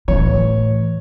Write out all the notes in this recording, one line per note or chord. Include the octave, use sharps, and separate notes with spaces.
A2 E3 C#5